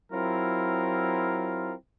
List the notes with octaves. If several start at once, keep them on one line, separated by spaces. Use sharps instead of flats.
F#3 C4 E4 F4 A#4